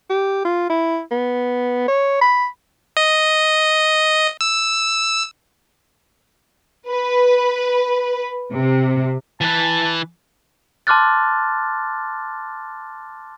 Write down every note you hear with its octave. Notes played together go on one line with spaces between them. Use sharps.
G4
F4
E4
B3
C#5
B5
D#5
E6
B4
C3
E3 B4 A5
A5 C6 D6 F6 F#6 A6